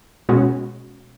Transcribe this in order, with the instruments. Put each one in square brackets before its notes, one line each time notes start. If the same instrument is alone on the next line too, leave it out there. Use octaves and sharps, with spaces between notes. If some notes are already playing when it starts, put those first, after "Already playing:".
[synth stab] B2 G#3 C#4 F#4